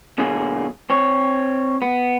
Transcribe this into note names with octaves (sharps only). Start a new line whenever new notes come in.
B2 D3 F#3 A#3 G#4
C4 C#5
B3